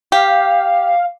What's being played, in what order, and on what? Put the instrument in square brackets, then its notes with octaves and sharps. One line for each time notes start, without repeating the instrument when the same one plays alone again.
[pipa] G4 [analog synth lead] F5